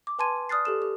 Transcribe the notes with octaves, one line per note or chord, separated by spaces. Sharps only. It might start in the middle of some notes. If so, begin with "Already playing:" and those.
D6
B4 G#5 A5 C6 G#6 D#7
A5
D5 D#6 F6 F#6 A6 C7
G4 A4 E7
G4